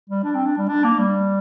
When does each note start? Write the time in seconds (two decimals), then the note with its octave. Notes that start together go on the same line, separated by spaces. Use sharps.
0.09 G3
0.24 D4
0.35 C4
0.46 D4
0.58 G3
0.69 D4
0.84 A#3
0.99 G3